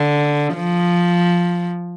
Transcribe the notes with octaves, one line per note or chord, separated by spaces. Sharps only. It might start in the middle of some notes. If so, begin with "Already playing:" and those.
Already playing: D3
F3